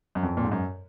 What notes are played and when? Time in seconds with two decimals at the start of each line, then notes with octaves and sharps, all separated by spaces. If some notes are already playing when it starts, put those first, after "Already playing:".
0.15 F#2
0.23 F2
0.37 A#2
0.44 G#2
0.52 F#2